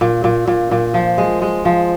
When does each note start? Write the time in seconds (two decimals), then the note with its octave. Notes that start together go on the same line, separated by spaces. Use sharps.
0.01 A#2
0.24 A#2
0.47 A#2
0.71 A#2
0.94 F3
1.18 G#3
1.42 G#3
1.65 F3